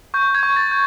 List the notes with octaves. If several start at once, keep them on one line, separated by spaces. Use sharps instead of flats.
C#6 G6
G#6
C#6
A6
G6